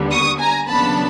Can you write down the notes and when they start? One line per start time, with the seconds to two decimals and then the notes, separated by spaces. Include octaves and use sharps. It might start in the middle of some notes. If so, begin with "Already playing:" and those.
Already playing: D#2 D3 G3 B3
0.11 C#6 D#6
0.40 G#5 A#5
0.68 D#2 C#3 F#3 B3 D4 A5 B5